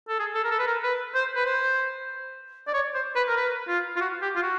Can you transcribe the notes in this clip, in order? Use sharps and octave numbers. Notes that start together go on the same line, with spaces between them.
A4
G#4
A4
A#4
A4
B4
A#4
B4
C5
B4
C5
D5
C#5
C5
B4
A#4
B4
F4
F4
F#4
G4
F4
F#4